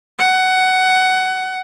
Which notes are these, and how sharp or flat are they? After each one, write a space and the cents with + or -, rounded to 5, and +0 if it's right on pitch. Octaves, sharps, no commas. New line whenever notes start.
F#5 +15